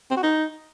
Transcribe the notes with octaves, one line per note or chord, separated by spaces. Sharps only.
C4
F#4
D#4